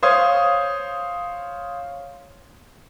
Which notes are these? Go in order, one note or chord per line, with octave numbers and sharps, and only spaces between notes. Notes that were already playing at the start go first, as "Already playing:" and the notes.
C5 C#5 F5 D#6 G#6